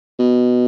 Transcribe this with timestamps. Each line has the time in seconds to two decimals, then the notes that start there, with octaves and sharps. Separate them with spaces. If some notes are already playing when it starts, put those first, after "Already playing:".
0.19 B2